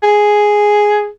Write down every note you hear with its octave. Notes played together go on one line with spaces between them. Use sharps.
G#4